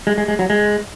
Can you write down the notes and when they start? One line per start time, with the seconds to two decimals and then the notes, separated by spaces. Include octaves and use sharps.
0.07 G#3
0.18 G#3
0.28 G#3
0.39 F#3
0.50 G#3